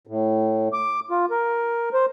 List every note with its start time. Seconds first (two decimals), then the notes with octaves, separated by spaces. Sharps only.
0.07 A2
0.73 D6
1.11 F4
1.30 A#4
1.94 C5